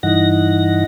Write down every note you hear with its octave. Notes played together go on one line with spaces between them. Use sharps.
G2 E3 D#4 F#5 A#6